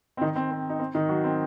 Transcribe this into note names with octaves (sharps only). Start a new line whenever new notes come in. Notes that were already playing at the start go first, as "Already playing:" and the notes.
C4
D#3 D#4
C4
C4
D#4
C4
D#3 D#4
F#3 F#4
C4